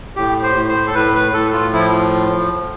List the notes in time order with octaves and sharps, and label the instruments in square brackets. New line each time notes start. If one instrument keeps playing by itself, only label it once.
[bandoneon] A2 G4
C5
A2
C5
A4
A2 B4
B4
A2 A4
F4
F3 E4